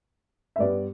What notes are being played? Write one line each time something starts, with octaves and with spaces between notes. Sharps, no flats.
E5
G2 G3 B3 D5